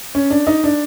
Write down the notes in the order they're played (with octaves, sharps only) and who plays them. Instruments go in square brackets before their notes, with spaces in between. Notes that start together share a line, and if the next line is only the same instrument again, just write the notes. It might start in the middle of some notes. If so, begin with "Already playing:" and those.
[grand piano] C#4
D4
D#4
D4